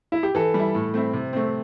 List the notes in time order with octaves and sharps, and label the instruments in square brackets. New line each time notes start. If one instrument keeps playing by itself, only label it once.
[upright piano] E4
G4
[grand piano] E3 [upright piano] A4
[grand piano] G3
E4
A2
A3 C4 E4
C3
A3 C4